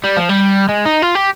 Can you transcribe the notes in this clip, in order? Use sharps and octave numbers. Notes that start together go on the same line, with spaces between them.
G3
F3
G3
G#3
D#4
F4
G4